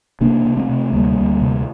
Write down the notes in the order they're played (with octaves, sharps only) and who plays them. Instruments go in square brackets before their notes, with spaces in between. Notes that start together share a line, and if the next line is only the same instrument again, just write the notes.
[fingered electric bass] C3 A#3 D4
C3
A3 C4
C3
D2 G3 A#3
D2
C3